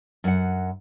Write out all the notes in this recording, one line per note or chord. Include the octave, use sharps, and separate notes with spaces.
F#2 F#5